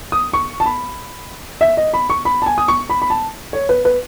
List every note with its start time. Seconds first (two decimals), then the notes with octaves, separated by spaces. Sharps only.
0.12 D#6
0.33 C#6
0.60 A5
0.66 B5
1.61 E5
1.77 D#5
1.94 B5
2.10 C#6
2.25 B5
2.42 A5
2.46 G#5
2.58 D#6
2.68 C#6
2.90 B5
3.02 B5
3.10 A5
3.53 C#5
3.69 B4
3.85 B4